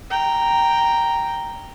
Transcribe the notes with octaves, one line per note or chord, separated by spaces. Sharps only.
G5 A#5